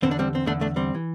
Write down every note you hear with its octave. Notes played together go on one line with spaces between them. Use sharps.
E2 D3 C4
D4
G3 C4
C4
E2 D3 A3 D4
A3 D4
G3 C4
E3